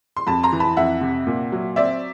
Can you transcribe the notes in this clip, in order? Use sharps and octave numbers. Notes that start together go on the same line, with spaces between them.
C6
F2 A5 B5
A#5 C6
E3
A5 B5
F2 E5 F#5
C3
A#2
F#3
C4 D5 E5